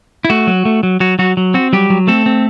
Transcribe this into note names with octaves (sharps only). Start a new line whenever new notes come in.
E4
A3 F#4
F#3
A3
F#3
F#3 F#4
F#3 F#4
F#3
C4 F#4
F#3 G3 G4
F#3
A3 C4 A4
C4